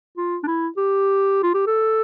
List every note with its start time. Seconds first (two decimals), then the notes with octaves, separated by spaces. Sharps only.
0.17 F4
0.43 D4
0.47 E4
0.77 G4
1.43 F4
1.54 G4
1.67 A4